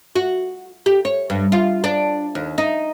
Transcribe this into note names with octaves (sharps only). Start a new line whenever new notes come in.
F#4
G4
C#5
G2
F4
D4
D#2
D#4